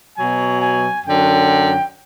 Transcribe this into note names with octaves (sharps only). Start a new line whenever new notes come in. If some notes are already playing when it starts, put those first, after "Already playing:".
B2 F#3 G#5
G#5
F#2 D3 F#3 G5